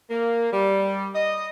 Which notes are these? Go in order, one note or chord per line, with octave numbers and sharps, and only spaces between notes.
A#3
G3
D#5